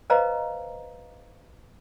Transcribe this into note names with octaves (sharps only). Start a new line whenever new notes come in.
B4 C5 D#5 F5 A#5